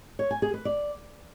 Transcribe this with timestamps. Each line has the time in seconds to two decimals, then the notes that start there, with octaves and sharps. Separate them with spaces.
0.19 C#5
0.31 G#5
0.42 G#4
0.54 B4
0.65 D5